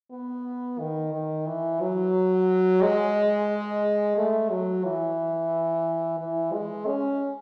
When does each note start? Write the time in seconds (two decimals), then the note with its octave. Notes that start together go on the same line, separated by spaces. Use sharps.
0.11 B3
0.79 D#3
1.13 D#3
1.47 E3
1.81 F#3
2.82 G#3
4.17 A3
4.50 F#3
4.84 E3
6.19 E3
6.53 G#3
6.86 C#4